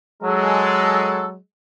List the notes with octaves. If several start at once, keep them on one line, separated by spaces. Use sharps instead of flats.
F#3 G#3 A4